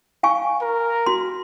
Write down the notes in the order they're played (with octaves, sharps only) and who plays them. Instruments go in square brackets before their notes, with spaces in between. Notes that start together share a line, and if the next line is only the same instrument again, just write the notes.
[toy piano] F5 G#5 C#6
[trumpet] A#4
[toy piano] F#4 C6